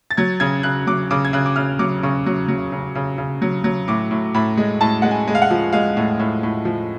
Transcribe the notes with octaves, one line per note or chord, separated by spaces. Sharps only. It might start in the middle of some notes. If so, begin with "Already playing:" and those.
A6
F#3 G#6
C#3 G#6
C#3 F#6
F#3 D6
C#3 D6
G#6
C#3 F#6
D6
C#3 F6
F#3 D6
C#3 C#6
F#3
F#3
C#3
C#3
C#3
F#3
F#3
A2 D6
A2
A2 B5
G#3
A2 A5
G#3 F#5
G#5
G#3
F5
F#5
F3
G#3 F5
A2
A2
A2
F3